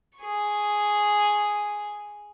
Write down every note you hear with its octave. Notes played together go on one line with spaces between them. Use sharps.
G#4 C#6